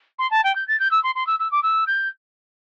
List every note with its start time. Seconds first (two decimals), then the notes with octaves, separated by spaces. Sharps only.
0.18 C6
0.30 A5
0.44 G5
0.55 G6
0.67 A6
0.79 G6
0.91 E6
1.03 C6
1.15 C6
1.27 E6
1.39 E6
1.51 D6
1.62 E6
1.87 G6